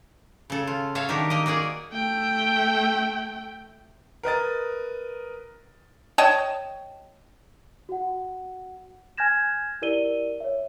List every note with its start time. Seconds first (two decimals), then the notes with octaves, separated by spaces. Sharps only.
0.50 C#3 A4
0.67 F4
0.95 F#4 A4 C#5 E5 F5
1.09 D#3 D4 G4 A#4
1.30 A#3 A#4 D#5
1.46 A#3 F#4 G#4 D5
1.91 A3 G5
4.23 A#4 B4 D#5 A6
6.18 C#5 D#5 G5 A5
7.89 F#4 F#5
9.17 G#5 F6 G6 G#6 A#6 E7
9.82 E4 G4 A#4 D5 D#7 G7
10.40 C#5 E5